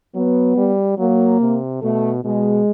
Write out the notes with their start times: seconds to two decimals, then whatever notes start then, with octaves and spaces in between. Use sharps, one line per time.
0.15 F#3 B3
0.57 G3
0.98 F#3 A#3
1.40 C3
1.82 B2 A3
2.24 B2 G#3